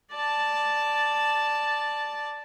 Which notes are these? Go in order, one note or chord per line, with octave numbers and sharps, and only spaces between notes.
D5 A5